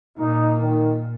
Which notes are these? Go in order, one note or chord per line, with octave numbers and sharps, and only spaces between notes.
A#2 D#4
D#3